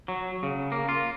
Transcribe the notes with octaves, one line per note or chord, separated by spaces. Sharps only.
F#3
C#3
A#3
F4